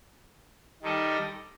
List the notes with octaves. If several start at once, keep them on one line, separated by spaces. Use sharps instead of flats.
D#3 G3 D#4 A4 D#5